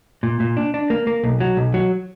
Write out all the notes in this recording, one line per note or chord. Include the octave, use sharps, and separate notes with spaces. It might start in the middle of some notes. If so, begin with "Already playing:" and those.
A#2
A#2
D4
D4
A#3
A#3
B1
F#3
B1
F#3